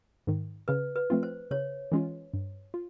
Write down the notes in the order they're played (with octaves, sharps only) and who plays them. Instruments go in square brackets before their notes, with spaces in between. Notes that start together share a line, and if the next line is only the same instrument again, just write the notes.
[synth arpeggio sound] G#2 D#3
[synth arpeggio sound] C#3 [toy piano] B4
[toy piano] B4
[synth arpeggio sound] F3 A3 C4 F4
[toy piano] C5
[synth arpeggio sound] C#3 [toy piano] C#5
[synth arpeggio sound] E3 G#3 C#4 F4
G2
F4